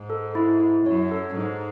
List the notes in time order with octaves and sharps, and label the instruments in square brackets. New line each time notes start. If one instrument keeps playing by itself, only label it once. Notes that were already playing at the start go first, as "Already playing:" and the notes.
Already playing: [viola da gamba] G#2
[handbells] A4
E4
E4
[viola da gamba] F#2 [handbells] C#5
[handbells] A4
[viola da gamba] G#2 [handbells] D#4